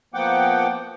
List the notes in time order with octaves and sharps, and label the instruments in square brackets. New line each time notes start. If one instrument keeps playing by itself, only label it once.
[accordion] F3 A#3 B3 F#5 G5 D6